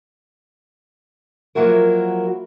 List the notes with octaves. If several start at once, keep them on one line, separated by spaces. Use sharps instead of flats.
F3 F#3 A#3 E4 F#4 A#4